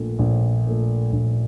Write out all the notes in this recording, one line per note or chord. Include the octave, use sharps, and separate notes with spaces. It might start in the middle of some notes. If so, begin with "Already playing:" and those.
Already playing: A#1 A#2 A3
A#1
A#2 A3
A#1